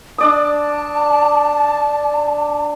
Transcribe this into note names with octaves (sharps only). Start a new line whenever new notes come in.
D4 D5 A5 D#6